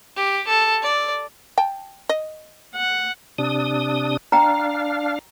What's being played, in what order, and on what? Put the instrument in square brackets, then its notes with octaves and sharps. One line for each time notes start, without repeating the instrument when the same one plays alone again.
[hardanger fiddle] G4
A4
D5
[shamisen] G5 A5
D#5
[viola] F#5
[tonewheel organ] C3 D4 D#6
[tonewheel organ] D4 F5 [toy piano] G5 A#5